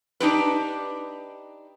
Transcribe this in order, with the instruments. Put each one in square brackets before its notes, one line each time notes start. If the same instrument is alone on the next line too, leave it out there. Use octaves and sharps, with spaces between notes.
[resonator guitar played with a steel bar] D4 D#4 G4 B4